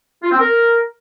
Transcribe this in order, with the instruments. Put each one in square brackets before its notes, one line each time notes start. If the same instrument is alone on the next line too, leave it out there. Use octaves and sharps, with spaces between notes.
[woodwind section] F4
C4
A#4